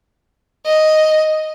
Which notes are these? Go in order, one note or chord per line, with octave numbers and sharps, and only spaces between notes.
D#5